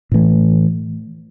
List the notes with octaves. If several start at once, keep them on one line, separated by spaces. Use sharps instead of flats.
A2 E3 A3